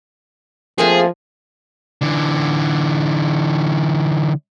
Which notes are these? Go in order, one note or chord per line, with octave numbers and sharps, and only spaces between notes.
F3 A3 A#3 C4 G#4
D3 E3